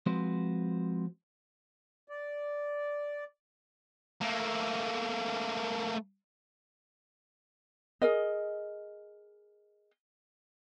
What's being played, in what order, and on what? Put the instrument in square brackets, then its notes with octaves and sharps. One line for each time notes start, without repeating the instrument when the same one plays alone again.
[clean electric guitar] F3 G#3 C4 F#4 B4 C5
[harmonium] D5
[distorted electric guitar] A3 A#3
[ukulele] G#4 A#4 D#5